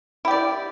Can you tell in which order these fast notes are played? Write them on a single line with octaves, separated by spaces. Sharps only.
E4 G4 D5